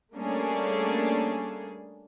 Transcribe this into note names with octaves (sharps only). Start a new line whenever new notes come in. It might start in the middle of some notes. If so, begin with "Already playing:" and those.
G3 A3 A#3 C#4 D4 G#4